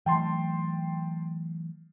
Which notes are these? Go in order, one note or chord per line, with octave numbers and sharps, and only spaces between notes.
E3 F#3 A3 G5 A5 C6